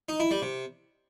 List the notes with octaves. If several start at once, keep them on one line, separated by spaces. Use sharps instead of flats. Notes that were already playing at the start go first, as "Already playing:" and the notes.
D#4
E4
G3
C3